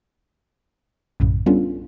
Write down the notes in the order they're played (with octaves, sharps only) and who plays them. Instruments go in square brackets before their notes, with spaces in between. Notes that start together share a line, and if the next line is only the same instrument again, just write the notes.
[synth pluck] A#1 F#2 A2 C#3
G3 B3 C#4 D4 F4 A4